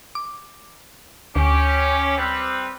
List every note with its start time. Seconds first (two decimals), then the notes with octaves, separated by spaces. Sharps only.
0.15 D6
1.36 D2 C#4 G4
2.18 G3 C4 B4